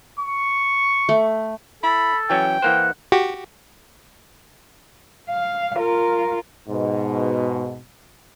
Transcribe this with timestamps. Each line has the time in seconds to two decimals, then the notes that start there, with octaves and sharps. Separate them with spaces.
0.19 C#6
1.09 A3
1.83 E4 A4 B5
2.30 E3 F#3 C#4 G5
2.62 E3 A#3 C5 F#5
3.12 F#4 G4
5.30 F5
5.78 F4 A#4
6.69 G#2 B2